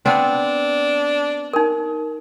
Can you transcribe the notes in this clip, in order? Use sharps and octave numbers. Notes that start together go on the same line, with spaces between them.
B3 C4 D4
D#4 A#4